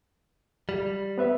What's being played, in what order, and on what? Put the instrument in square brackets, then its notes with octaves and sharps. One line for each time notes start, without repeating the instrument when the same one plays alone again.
[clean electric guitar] G3
[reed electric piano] B3 B4 E5